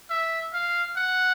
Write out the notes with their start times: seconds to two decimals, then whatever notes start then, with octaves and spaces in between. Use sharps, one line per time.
0.10 E5
0.53 F5
0.97 F#5